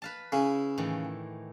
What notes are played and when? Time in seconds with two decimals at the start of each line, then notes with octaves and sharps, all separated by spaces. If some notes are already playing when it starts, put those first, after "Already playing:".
0.02 B4 F5 A5
0.32 C#3 E4 G#5
0.78 A2 D#3 E3